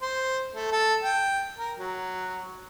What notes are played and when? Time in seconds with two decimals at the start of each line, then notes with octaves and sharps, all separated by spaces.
0.02 C5
0.53 A3
0.72 A4
1.02 G5
1.59 A#4
1.79 F#3